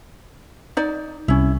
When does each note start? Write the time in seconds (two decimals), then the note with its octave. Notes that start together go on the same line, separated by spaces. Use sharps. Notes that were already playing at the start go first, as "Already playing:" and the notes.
0.77 D#4 D5
1.28 C2 C#4 E4